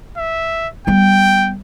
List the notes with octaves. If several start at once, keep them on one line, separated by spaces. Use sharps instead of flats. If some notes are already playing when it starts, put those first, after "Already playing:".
E5
G3 B3 G5